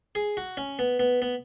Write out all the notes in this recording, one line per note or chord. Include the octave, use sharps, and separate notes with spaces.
G#4
F#4
C#4
B3
B3
B3